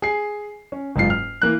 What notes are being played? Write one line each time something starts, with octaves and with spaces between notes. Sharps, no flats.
G#4 C7
C#4
F#1 G#2 F4 C7
F6
E3 A#3 F#6